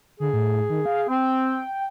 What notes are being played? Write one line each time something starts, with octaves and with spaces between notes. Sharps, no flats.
D3 G#4
A2
D#3
F5
C4 G5